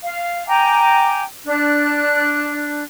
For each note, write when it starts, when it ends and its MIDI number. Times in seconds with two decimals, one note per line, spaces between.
0.04 0.46 77
0.48 1.22 79
0.48 1.22 80
0.48 1.22 82
0.48 1.22 86
1.45 2.83 62
1.45 2.83 90